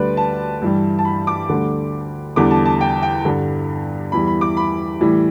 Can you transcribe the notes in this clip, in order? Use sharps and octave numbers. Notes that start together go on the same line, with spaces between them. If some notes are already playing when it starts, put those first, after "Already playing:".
Already playing: D2 D3 G3 B4 D5
A5
G2 E3 G3
A5
B5
D6
D2 D3 G3
E2 D3 G3 D6
A5
A5
G5
G5
G2 D3 G3
E2 E3 G3 B5
B5
D6
B5
A2 E3 G3